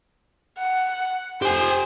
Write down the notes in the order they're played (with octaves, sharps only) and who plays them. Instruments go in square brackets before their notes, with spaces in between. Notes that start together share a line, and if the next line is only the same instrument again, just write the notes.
[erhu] F#5
[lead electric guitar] G4 G#5 [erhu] C5